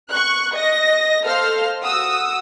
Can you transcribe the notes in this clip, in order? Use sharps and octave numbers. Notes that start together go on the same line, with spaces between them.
C#6 F#6
D#5 A#6
A4 C5 F5 F6
F#4 D#6 E6